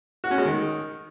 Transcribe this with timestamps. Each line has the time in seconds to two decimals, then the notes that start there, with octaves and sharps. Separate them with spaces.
0.24 F#4
0.31 C#4
0.38 G#3
0.45 D#3